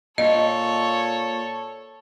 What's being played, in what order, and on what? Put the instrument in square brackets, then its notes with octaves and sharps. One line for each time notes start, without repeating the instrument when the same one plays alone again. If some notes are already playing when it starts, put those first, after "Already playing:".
[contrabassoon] A#2 [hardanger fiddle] A4 C#5 [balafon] D#5